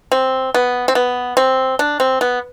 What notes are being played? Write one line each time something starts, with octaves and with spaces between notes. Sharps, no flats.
C4
B3
C4
B3
C4
D4
C4
B3